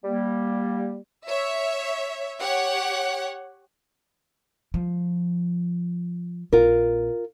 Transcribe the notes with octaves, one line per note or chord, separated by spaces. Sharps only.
G3 A#3
C#5 E5
G4 C#5 F#5
F3
A#1 C4 F4 A#4